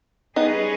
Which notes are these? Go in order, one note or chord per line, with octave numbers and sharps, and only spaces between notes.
G3 B3 C#4 D#4 G#4 B4 D#5